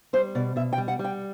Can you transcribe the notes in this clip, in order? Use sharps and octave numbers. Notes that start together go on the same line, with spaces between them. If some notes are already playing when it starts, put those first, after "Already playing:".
G3 C5
B2 D5
B2 E5
G5
G3
F#5
G3
G5